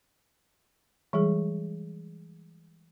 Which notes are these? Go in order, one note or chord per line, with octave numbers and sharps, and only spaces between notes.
E3 G3 G#3 G#4